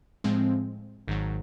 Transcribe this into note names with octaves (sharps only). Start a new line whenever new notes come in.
A2 F3 G#3 C4
G#1 G#2 D#3 F#3